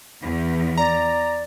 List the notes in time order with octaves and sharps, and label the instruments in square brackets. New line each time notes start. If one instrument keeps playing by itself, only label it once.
[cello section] E2
[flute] D5 [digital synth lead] A#5